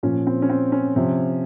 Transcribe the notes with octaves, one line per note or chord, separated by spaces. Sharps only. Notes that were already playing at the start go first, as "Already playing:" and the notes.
A#2 F3 C#4
C4
C#4
C4
C#4
C3 F3